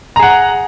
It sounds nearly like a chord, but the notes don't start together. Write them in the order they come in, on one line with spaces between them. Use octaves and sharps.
A#5 G#4 F#5